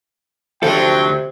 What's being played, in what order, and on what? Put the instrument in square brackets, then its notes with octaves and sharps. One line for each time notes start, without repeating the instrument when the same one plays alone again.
[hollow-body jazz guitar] D2 A4 [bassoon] C3 [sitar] F3 F#3 [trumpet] G5